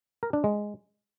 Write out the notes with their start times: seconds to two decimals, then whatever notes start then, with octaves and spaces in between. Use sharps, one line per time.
0.23 A#4
0.33 D4
0.44 G#3